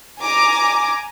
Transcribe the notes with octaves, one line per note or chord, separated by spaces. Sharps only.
G#5 A#5 D6